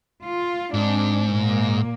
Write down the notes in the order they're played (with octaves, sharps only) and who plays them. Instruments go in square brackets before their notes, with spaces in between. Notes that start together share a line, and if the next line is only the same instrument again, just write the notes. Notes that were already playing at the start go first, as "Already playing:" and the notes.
[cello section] F4
[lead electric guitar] G#2 [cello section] C4 D4
[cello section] A#2 A#3